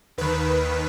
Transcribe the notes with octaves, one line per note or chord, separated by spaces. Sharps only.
D#2 D#3 B4